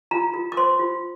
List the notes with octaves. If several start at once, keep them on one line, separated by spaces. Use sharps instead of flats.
F4 A#5
F4
D6
C5 C6
F4